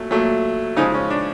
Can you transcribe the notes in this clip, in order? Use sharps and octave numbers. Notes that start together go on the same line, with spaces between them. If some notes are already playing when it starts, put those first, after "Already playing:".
Already playing: A#2 F#3 A3
A#2 F#3 A3
C#3 F3 G#3 D#4
C#4
D4